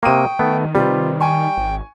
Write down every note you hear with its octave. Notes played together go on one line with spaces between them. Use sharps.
C3 A#3 G5 C#6 D#6 D#7
D#3 A3 B3
C3 G3 F4 B4
G5 G#5 C#6
G#1